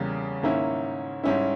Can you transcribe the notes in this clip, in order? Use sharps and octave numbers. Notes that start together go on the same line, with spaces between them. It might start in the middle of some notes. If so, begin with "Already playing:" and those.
Already playing: E2 C#3 G3 A#3 C#4
G#2 D#3 A#3 C#4 E4
G#2 G3 C#4 E4